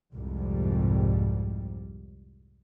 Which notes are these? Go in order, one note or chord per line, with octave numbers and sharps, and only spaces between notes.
C2 F2 G#2 G3